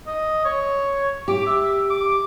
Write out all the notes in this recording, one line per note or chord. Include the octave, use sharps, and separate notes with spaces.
D#5
C#5
G4 D6
E5
D6